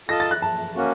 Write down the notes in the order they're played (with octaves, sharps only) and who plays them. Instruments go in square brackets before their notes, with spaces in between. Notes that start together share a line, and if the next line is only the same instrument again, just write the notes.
[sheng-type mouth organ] F4 A4 D#5 A5 [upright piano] A#6
[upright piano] A6
F#6
A5
[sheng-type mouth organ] A#3 C#4 F#4